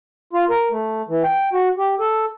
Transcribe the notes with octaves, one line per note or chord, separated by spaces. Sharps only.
F4
A#4
A3
E3
G5
F#4
G4
A4